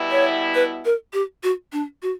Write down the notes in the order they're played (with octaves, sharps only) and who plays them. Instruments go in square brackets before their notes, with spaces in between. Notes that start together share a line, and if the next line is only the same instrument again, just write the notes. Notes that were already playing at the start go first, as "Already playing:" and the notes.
Already playing: [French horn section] B2 G3 B3 E4
[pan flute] C#5
B4
A#4
G4
F#4
D4
F#4